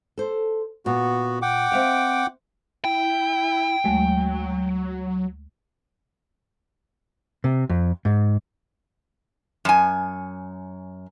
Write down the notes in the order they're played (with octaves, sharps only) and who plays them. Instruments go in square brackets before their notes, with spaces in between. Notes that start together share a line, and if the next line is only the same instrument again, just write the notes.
[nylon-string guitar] A4 C5
[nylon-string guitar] A#2 [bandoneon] B3 F#4
[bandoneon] F#5 G5 D6
[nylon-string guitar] C4 E5 F5
[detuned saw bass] E4 [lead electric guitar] G5
[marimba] D2 G#3 A3 [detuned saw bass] F#3
[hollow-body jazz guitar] C3
F2
G#2
[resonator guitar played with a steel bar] F#2 G#5